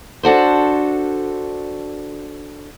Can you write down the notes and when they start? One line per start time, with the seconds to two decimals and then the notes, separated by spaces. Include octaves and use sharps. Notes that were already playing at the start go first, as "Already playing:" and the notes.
0.23 D4 F#4 A4 C5